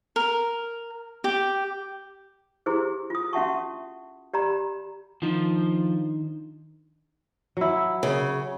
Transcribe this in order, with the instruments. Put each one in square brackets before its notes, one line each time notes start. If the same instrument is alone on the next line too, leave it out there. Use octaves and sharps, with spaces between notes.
[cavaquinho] A#4
G4
[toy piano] E4 G4 G#4 C5
F4 D#6
C#4 F#4 E5 F#5 A5 C#6
G4 D5 A#5 B5
[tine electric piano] D#3 D4 D#4 [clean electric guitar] F3 C5
[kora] F#3 E4
[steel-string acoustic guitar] C#3